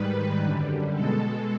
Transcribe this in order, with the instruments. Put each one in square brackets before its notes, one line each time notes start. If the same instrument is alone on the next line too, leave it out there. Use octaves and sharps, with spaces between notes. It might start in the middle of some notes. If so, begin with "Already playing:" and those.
Already playing: [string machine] G#2 D#3 G3 B4
F#2 D3 G3
B2 G#3 A4